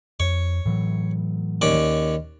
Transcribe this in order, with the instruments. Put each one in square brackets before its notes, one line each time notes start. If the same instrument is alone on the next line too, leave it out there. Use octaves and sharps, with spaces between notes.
[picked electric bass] F2 [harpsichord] C#5
[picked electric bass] A2 E3 F#3
[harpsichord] D#2 C#4 D5